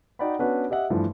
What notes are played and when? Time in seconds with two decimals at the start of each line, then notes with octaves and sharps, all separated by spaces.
0.19 D#4 F#4 D5 F#5 G5 B5
0.39 B3 C#4 D4 F#4 B4
0.70 G4 D#5 E5 F#5
0.90 G2 E3 F3 A3